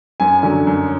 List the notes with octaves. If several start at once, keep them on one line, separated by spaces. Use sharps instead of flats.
F#2 G#5
D3 F#3
F#2